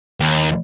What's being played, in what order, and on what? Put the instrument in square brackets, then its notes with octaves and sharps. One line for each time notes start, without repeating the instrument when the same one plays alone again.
[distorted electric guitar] D#2